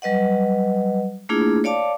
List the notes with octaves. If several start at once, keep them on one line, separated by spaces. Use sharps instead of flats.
F#3 G3 B4 D#5 F#5
A3 A#3 D4 E4 F4 G#4
C#5 D5 F5 A5 D6